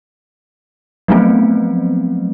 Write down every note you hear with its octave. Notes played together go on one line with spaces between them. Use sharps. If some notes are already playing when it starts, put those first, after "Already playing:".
F3 F#3 A3 B3 C4